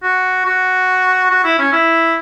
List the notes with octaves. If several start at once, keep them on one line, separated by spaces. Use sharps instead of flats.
F#4
F#4
F#4
E4
C#4
E4